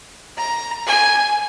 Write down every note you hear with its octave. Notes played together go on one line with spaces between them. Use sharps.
A#5
G#5